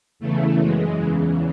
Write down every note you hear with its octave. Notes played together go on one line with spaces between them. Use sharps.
E2 C#3 E3 A3
F#2 E3 G#3
E2 C#3 E3